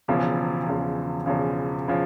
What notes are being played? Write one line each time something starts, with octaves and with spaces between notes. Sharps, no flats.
E1 E2 C#3 F3
E1 E2 C#3 F3
E1 E2 C#3 F3
C#3 F3